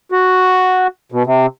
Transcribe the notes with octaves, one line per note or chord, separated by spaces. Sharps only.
F#4
B2
C3